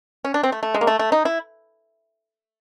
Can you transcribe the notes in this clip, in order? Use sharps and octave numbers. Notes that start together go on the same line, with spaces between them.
C#4
D4
C4
A3
A3
G#3
A#3
A3
A3
D#4
E4